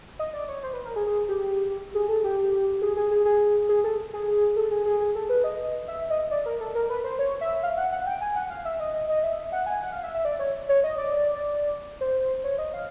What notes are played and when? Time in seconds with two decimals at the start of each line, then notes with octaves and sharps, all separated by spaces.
0.19 D#5
0.33 D5
0.48 C#5
0.63 C5
0.73 B4
0.85 A#4
0.96 G#4
1.07 G#4
1.29 G4
1.95 G#4
2.09 A4
2.24 G4
2.82 G#4
2.97 G#4
3.11 G#4
3.25 G#4
3.69 G#4
3.84 A4
4.13 G#4
4.56 A4
4.71 G#4
4.86 G#4
5.00 G#4
5.15 A4
5.29 B4
5.44 D#5
5.88 E5
6.10 D#5
6.31 D5
6.46 A#4
6.61 A4
6.75 A#4
6.90 B4
7.04 C5
7.19 C#5
7.41 E5
7.63 F5
7.77 F#5
7.92 F#5
8.06 G5
8.21 G#5
8.36 F#5
8.50 F5
8.65 E5
8.80 D#5
8.94 D#5
9.09 D#5
9.23 E5
9.52 F#5
9.66 G#5
9.81 F#5
9.92 F5
10.03 E5
10.14 E5
10.25 D5
10.39 C#5
10.69 C#5
10.84 D#5
10.98 D5
12.01 C5
12.44 C#5
12.59 D#5
12.74 F5